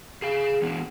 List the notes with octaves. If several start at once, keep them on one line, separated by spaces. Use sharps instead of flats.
G#4 F5
E3 B3 D4